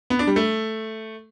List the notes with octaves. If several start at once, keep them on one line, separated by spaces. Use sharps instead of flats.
B3
D4
G3
A3